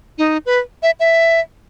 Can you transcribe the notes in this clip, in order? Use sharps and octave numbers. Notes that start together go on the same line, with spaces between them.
D#4
B4
E5
E5